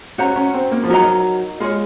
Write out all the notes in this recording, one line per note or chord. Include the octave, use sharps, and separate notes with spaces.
C#4 F#4 C5 F#5 A#5
C#4
C4
A#3
F3
F#3 D#4 A#4 D#5 A#5
G#3 F4 G#4 C#5